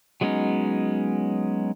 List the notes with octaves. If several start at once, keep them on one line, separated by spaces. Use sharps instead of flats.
F#3 G#3 B3 C#4 D#4